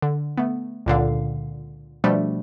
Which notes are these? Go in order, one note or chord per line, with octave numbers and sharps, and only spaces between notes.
D3
A3 B3
C#2 A#2 D3 F5
B2 F3 G3 A3 D4